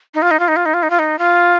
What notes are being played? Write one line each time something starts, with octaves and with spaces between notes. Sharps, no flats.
D#4
F4
D#4
F4
D#4
F4
D#4
F4
D#4
F4
D#4
F4